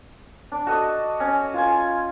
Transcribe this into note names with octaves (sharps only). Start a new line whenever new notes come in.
D4
F#4 A4 D#5
C#4
F4 G#5